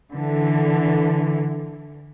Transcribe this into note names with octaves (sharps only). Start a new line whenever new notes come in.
D3 E3